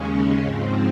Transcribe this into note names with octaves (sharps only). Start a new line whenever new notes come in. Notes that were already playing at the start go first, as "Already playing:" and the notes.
Already playing: D#2 C#3 G#3 C#4
G#2 F3 C4